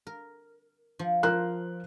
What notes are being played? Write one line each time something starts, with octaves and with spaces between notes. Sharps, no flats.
A#4
F3
F3 A#4 C5 F#6